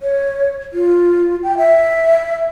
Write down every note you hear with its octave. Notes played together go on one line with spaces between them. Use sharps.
C#5
F4
G5
E5